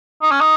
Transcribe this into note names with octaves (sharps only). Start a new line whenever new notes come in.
D#4
C#4
D#4